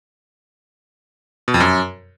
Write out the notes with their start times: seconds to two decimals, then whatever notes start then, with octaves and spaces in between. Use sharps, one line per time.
1.48 B2
1.54 F2
1.60 F#2